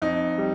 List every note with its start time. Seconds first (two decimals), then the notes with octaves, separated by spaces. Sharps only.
0.02 F2 D#4
0.38 G3